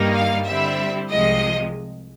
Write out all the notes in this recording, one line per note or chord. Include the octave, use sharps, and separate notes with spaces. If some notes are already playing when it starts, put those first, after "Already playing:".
Already playing: G2 D#3 G3 A#3 D#4
F5
D3 G3 C4 E4 E5
C2 C3 F3 G#3 D#5